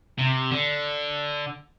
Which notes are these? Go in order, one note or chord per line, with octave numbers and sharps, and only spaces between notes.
C3
D3